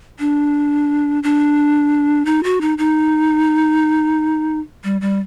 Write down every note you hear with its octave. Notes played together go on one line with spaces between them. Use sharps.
D4
D4
D#4
F#4
D#4
D#4
G3
G3